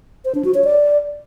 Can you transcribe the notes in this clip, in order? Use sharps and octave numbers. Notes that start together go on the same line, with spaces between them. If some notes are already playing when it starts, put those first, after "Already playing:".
C5
D4
F#4
C#5
D5